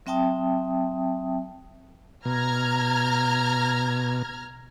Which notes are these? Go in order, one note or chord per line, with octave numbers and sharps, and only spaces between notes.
F#3 C4 E5 G5 A5 D#6
B2 A#5 F6 G#6